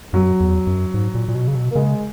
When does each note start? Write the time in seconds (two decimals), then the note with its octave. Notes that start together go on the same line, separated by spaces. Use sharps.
0.13 F#2 F#3
0.40 E2
0.67 F#2
0.94 G#2
1.15 A#2
1.28 A#2
1.35 B2
1.48 C#3
1.55 B2
1.71 A#3
1.75 C#3 G#3